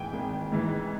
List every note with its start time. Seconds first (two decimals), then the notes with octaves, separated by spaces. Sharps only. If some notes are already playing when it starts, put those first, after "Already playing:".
Already playing: G#1 G#2 E3 G5 G#5
0.13 G#1
0.52 G#2 E3